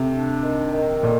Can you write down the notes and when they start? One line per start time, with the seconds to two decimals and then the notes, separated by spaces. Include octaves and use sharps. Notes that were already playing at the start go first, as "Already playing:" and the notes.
Already playing: C3 A3
0.12 D4
0.42 D#3
0.72 D#3
1.03 A#2 A3